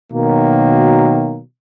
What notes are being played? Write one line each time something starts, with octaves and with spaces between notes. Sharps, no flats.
B2 D#3 F#3 A#3